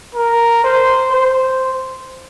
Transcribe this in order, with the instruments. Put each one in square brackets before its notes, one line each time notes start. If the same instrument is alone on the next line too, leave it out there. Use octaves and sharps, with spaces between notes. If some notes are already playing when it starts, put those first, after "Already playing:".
[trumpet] A#4
C5
C5